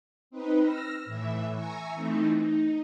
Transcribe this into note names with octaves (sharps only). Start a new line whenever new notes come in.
C4 D#4 B4
E6 F6 A#6
A2 E3 E5
E5 G#5 A#5 C#6
E3 A3 C4 D#4
D#4